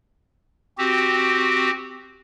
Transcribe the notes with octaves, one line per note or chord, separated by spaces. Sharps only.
C4 F#4 G4